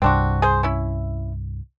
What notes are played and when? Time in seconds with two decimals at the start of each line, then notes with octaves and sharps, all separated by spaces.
0.02 C2 G2 C4 D4 F#4
0.42 G#4 C5
0.63 C#4 E4